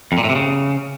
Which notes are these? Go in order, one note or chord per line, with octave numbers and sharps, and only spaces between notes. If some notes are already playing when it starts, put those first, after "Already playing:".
F2
A#2
A2
C3
C#3